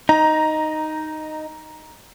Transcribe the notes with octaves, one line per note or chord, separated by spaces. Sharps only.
D#4 A#5